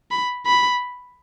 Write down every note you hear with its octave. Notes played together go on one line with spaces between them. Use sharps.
B5
B5